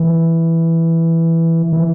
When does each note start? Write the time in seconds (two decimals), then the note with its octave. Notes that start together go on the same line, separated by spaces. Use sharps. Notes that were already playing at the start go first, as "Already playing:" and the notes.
Already playing: E3
1.73 E3